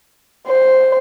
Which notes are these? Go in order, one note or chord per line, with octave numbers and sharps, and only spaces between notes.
C5